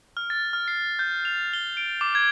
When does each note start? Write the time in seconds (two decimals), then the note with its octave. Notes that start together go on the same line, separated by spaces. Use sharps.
0.17 F6
0.30 A6
0.53 F6
0.68 C7
0.99 G6
1.25 F7
1.53 G7
1.77 D7
2.01 D6
2.15 G#6